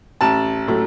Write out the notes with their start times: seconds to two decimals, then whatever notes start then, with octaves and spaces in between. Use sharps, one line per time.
0.21 A1 A5
0.68 A2 F#3 A3